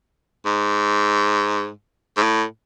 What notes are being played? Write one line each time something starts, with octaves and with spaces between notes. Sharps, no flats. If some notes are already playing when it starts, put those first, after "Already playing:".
G#2
G#2
A2